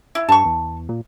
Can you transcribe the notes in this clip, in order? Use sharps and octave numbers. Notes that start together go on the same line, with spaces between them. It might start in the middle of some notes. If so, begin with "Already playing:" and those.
E4
G2 A5 C#6
E2
A#2